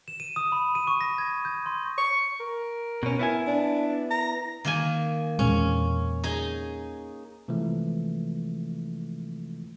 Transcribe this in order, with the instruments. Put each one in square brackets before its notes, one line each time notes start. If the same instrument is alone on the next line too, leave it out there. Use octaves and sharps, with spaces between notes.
[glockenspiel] E7
D#7
D#6
B5
D#7
C#6
A#6
G#6
G6
C6
[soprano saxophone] C#6
A#4
[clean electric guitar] B2 C#4
B3 E4 G#5
[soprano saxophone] D4
A#5
[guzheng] D#3 A#3 G#5
[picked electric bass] E2 A#2 G#3 [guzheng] C#4
[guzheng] D#4 G#4
[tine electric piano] C3 E3 F3 G#3 A3